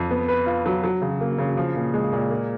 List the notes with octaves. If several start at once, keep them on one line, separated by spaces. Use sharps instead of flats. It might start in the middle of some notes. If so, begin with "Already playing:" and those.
Already playing: F2
B3
B4
F4
F#3
F#3
C#3
A#3
C#3
F3
A#2
G#3
A#2
A#3